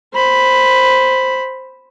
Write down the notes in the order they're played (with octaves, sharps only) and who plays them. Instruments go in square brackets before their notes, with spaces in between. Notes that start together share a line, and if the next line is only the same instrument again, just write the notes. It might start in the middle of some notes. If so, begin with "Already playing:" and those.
[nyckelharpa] C5 B5